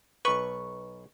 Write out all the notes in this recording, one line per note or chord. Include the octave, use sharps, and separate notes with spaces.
B1 B4 C#6